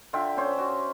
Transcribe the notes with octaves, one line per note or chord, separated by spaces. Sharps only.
D3 F4 E5 G5
C#4 C5
F#4